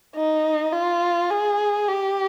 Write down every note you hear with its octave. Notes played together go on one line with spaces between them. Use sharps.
D#4
F4
G#4
G4